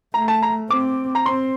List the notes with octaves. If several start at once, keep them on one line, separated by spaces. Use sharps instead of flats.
A3 A#5
A5
A#5
C4 D6
A#5
C4 C6